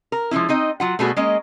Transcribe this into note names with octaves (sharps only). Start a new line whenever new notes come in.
A#4
F3 G#3 A3 C#4 E4
C4 D#4 D#5
F#3 F4 F#5
B2 G3 A3 B3 F#4 G#4
G#3 A#3 C#4 D#5